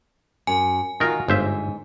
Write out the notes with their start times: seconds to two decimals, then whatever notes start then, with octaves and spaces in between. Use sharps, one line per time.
0.47 F#2 G#5
1.00 D#3 F4 F#4 A#4
1.28 G1 G#2 C5 E5